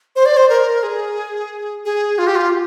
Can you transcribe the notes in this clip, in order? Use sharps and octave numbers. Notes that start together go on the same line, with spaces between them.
C5
D5
C5
A#4
G#4
G#4
F4
G4
F4